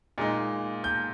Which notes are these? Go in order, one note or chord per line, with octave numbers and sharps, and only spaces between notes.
A#2 G#3 D#4
G6